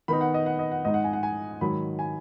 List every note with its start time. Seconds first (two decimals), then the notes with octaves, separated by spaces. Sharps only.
0.08 D#3 B3 D#4 B5
0.21 F#5
0.34 D#5
0.46 F#5
0.59 D#5
0.72 F#5
0.85 G#2 G#3 D#4 D#5
0.94 F#5
1.04 G#5
1.13 F#5
1.23 G#5
1.61 G#2 D#3 F#3 B5
1.99 G#5